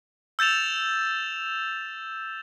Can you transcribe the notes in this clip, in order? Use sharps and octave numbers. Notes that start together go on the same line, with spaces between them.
E6 G6 A6 E7 F7